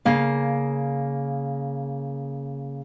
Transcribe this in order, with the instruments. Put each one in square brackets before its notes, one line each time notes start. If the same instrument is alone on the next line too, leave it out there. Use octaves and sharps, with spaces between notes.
[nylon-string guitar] C#3 A#3 F5